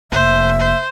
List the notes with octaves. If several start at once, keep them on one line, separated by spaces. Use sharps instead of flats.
F1 A#3 C5 E5
C5